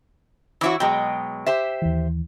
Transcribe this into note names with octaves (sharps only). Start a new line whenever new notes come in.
E3 E4 F#4 C#5 E6
B2 F#3 G#3 G5
G4 C5 E5
D#2 E3